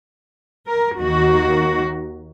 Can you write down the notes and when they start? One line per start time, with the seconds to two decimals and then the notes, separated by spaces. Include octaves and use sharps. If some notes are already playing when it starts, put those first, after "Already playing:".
0.68 A#4
0.97 D#2 D#3 A#3 F#4